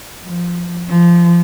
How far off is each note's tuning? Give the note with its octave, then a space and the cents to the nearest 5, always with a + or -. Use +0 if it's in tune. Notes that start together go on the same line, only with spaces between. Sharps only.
F3 +0
F3 -20